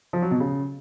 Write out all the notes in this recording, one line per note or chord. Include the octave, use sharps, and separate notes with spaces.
F3
F#3
B2
C#3